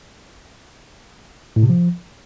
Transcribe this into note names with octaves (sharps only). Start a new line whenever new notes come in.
A2
C3
F3